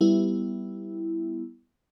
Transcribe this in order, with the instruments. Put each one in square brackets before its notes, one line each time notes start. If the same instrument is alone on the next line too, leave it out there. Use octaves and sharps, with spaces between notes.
[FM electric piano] G3 B3 E4